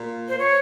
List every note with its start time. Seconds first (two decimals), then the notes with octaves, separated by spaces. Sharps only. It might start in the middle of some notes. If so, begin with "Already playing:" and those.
Already playing: A#2
0.29 A#2 C5
0.39 C#5